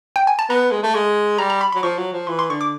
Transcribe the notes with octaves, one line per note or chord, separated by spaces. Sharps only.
G5
G#5
A5
B3 A#5
G#3
A3
G#3
G3 A#5
A#5
B5
B5
F#3
F3 C#6
F#3
F3
E3 C6
C6
D3 C#6
D6